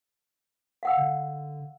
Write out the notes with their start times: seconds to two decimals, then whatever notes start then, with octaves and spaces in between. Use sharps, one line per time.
0.83 F5 F#5 E6
0.97 D3